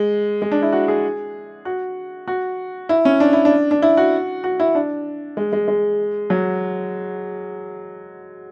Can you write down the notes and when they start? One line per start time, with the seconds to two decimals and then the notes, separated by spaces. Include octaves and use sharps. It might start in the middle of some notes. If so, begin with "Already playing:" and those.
Already playing: G#3
0.42 G#3
0.52 D4
0.62 E4
0.73 F#4
0.88 G#4
1.65 F#4
2.28 F#4
2.89 E4
3.05 C#4
3.20 D4
3.33 E4
3.45 D4
3.71 D4
3.82 E4
3.97 F#4
4.44 F#4
4.60 E4
4.75 D4
5.37 G#3
5.53 G#3
5.68 G#3
6.30 F#3